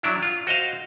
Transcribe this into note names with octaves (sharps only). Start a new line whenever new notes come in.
F#3 D4 E4
F4
F#4 C5 D#5 F5